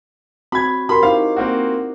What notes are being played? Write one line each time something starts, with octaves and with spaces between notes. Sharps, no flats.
C4 F#4 B5 G#6
F#4 G4 A#4 B5 C6
D#4 E4 C5 F5
A#3 C4 F#4